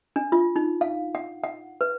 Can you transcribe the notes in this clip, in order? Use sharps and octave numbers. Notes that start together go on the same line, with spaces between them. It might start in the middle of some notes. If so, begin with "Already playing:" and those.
D4
F4
D#4
F5
F#5
F#5
B4